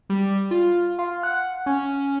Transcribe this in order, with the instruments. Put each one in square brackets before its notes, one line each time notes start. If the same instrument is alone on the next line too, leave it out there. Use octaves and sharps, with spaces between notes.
[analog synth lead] G3
F4
F4
F#5
C#4